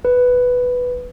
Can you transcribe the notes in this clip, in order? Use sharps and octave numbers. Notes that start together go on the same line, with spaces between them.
B4